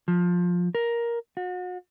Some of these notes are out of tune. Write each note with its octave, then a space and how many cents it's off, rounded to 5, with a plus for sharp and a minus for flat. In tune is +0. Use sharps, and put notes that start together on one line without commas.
F3 +15
A#4 +10
F#4 -35